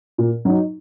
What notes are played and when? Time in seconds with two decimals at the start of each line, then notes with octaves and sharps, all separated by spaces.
0.18 A#2
0.45 F#3 D#4